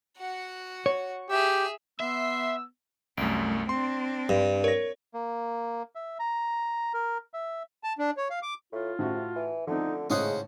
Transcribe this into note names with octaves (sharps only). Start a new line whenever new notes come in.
F#4 F#5
C#5
G4 G#4 E5
B3 E5 C6 E6
C2 F#2 A3 D7
C4 D4 C6
G2
A#4 C#5 A#6
A#3
E5
A#5
A#4
E5
A5
D4
C#5
F5
D6
A2 F4
A2 C3 F#4
E3
D3 F3 A3 C4 D#4
G#1 A2 C#3 G#3 C#4 C5 F#5 D#6